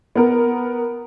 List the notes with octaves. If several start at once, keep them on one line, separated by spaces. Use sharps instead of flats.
B3 A#4